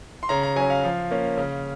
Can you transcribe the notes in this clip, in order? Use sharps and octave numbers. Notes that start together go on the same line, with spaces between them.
C6
C#3 A#5
A#5
F#3 C#4 G#5
F5
F3
A#3 C#4
C#3